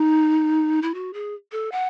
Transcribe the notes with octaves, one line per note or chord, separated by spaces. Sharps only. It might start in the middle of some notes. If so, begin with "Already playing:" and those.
Already playing: D#4
E4
F#4
G#4
A4
F#5